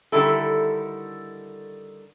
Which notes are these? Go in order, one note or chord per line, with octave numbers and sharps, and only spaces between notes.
D3 D#3 G3 E4 A4